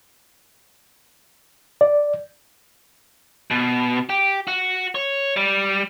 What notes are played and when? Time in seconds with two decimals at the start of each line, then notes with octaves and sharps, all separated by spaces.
1.81 D5
3.51 B2
4.10 G4
4.48 F#4
4.95 C#5
5.37 G3